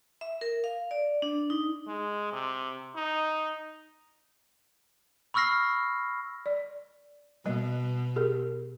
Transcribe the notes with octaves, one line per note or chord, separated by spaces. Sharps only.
E5
A#4
F5
D5
D4
D#4
G#3
C3
D#4
B5 C#6 E6 F6 A#6 C7
D5
B2 G3 D#5
G4 G#4 A#4